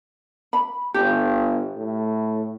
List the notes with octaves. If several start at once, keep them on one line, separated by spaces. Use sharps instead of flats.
B5
G1 G4
A2